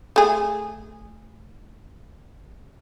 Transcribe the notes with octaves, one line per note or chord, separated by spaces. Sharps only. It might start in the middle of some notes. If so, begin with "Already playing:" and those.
A3 G#4